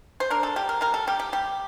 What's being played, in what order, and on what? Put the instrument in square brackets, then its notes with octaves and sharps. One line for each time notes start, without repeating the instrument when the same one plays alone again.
[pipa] C5
D4 A#4
A4
G3 G4
A#4
G3 A#4
A4
G3 G4
G4
G3 G4